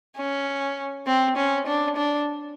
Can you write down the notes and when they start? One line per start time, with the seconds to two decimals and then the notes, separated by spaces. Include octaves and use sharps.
0.17 C#4
1.07 C4
1.37 C#4
1.67 D4
1.97 D4